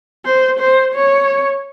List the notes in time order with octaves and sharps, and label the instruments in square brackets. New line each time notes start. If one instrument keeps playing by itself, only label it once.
[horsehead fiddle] C5
C5
C#5